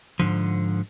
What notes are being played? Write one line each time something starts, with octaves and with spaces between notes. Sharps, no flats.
G#2 D3 F3